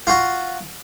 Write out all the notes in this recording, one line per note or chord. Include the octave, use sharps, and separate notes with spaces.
F4 F#4